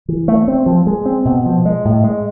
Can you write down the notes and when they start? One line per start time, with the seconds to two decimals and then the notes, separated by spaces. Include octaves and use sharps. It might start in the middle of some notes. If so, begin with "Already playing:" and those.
0.09 E3
0.28 A3
0.48 C4
0.66 F3
0.87 G#3
1.06 C4
1.25 B2
1.46 F3
1.65 G#3
1.85 A2
2.04 G#3